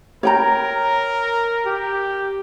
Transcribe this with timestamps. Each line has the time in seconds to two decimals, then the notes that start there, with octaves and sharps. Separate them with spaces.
0.23 A#4 C#5 G5 A#5
1.66 G4